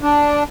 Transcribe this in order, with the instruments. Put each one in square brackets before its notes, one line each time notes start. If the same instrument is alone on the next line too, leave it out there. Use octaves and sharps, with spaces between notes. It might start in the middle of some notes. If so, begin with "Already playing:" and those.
[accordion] D4